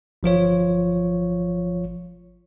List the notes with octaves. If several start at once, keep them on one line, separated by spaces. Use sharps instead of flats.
G1 F3 F4 C#5